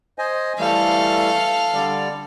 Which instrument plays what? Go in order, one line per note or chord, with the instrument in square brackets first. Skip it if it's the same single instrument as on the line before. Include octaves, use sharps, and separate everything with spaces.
[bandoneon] C5 D#5 G#5
[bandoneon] E3 G3 A3 [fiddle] A4 F5
[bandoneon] D3 G3 D5